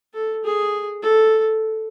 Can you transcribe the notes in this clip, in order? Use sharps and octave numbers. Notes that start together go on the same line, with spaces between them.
A4
G#4
A4